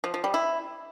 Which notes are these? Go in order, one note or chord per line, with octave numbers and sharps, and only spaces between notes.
F3
F3
G3
E4